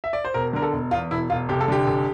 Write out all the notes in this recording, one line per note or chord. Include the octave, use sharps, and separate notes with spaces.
E5
D5
C5
E1 A#4
D3 A#4
A4
E1
E2 F4
E1 E4
E1 F4
F1 G4
A4
D3 G4
F1